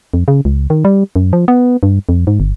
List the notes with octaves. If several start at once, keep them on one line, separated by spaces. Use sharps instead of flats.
F2
C#3
C#2
D#3
G3
F#2
F3
B3
G2
F2
G#2
G1